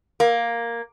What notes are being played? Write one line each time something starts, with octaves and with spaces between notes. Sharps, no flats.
A#3